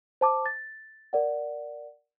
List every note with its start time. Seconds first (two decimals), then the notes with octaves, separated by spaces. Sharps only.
0.21 C5 A5 D6
0.46 A6
1.13 A#4 D5 F#5